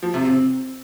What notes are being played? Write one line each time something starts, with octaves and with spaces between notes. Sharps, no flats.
F3
C3
C4